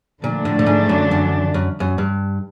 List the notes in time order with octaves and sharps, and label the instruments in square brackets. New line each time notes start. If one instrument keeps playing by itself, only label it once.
[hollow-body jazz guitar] A#2 [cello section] D3 F3 A3 D4
[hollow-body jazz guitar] A2
A2
G#2
F#2
F#2
F#2
F#2
G2